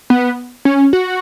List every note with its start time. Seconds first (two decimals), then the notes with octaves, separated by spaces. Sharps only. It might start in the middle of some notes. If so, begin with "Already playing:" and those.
0.10 B3
0.65 C#4
0.93 F#4